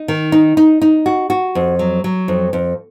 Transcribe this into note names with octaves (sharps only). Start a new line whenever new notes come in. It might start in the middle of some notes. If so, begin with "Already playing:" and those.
Already playing: D#4
D#3
D#4
D#4
D#4
F#4
F#4
F2
F#3
F#3
F2
F2